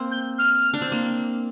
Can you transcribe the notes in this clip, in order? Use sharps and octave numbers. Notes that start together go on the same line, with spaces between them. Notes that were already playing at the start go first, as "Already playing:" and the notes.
Already playing: A#3 C4
G6
F6
D4
C4
A#3